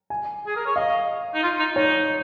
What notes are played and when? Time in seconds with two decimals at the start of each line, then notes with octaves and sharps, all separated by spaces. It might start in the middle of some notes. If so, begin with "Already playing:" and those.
0.10 G#5
0.47 G#4
0.56 A#4
0.66 C#5
0.76 D#5 F5
1.34 D#4
1.43 F4
1.59 D#4
1.76 D#4 C#5